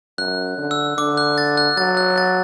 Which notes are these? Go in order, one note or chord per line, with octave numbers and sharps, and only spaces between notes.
F#2 F#6
D3
E6
D3 D6
F#6
A6
F#6
F#3 A6
F#6
A6